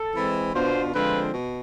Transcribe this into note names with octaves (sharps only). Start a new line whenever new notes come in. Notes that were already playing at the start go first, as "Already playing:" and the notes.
Already playing: A4
E3 G#3 C4 E4
B2 B3 D4 F4 C5
D3 F3 G#3 C4 F4 B4
B2